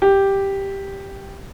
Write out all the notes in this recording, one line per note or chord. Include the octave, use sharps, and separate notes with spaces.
G4